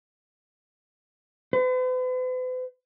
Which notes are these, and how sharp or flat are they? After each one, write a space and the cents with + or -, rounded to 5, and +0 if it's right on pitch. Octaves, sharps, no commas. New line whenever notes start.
B4 +45